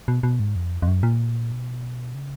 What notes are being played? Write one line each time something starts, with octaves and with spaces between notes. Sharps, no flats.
B2
B2
G#2
F2
F2
F#2
A#2
B2
C#3